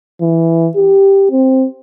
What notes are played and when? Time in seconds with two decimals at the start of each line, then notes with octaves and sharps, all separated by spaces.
0.21 E3
0.76 G4
1.31 C4